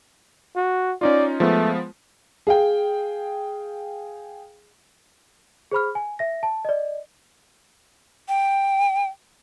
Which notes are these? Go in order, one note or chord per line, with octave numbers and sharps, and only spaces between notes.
F#4
C#4 D#4 F4 D5
F3 G#3 A3 B3
G#4 F5 G5
G#4 C5 B5 F6
G#5
E5 A#6
A5
D5 D#5
G5